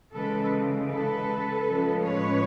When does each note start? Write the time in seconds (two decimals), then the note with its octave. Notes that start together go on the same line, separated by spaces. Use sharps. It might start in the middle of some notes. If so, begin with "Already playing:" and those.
0.14 C#3 E3 G#3 A4 B4
0.90 A4 B4
1.67 A2 F3 G#3 C#4
2.05 B4 C#5